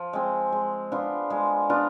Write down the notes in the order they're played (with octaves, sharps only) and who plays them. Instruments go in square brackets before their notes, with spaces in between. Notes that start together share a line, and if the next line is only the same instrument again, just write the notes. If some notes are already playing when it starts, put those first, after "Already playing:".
Already playing: [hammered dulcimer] F3
G#3 C4
G#3
B3 D4 F4
G#3
B3 D4 F4